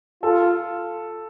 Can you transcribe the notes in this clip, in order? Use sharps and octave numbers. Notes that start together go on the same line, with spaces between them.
F4 A4